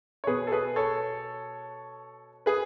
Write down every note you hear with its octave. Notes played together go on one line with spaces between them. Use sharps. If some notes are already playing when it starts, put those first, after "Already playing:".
C#5
B2 G#4 B4
A4
G#4 B4
A4 C#5
G#4 B4